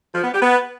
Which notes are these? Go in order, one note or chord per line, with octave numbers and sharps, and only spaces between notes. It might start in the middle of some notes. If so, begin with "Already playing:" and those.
F3
B3
G4
B3